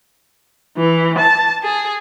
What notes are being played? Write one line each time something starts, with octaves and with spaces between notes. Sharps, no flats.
E3
A5
G#4